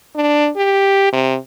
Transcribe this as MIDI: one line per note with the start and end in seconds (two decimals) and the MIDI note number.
0.15 0.49 62
0.57 1.10 67
1.12 1.37 48